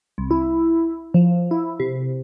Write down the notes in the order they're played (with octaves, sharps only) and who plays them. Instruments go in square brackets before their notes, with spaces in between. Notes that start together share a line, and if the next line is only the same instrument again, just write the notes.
[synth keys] C2
E4
F3
E4
C3